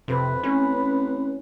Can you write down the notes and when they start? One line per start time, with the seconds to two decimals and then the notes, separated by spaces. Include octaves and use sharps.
0.08 F2 C3 C4 B4
0.43 A1 C#4